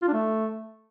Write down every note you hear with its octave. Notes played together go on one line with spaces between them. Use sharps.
F4
D4
A3